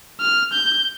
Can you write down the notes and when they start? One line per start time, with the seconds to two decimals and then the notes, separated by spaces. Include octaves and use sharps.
0.21 F6
0.53 G6